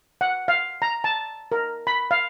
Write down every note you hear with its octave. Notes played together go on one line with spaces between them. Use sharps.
F#5
F5
A#5
A5
A#4
B5
F5